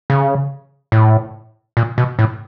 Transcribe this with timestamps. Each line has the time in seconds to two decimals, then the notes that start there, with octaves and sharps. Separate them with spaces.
0.10 C#3
0.92 A2
1.77 A#2
1.98 B2
2.19 A2